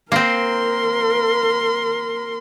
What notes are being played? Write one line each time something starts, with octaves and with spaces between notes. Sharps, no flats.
A#3 C4 A#4 C6